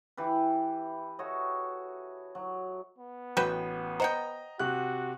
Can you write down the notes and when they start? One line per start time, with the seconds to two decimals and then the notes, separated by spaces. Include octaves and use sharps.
0.17 E3 G4 B4
1.19 F#4 A4 C#5 D#5
2.35 F#3
2.99 B3
3.37 A1 F#4 B4 G5
4.00 C5 D#5 F#5 G5 A#5
4.59 C3 F#4 F#6